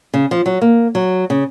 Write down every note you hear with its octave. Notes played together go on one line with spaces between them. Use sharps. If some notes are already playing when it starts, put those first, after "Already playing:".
C#3
F3
F#3
A#3
F#3
C#3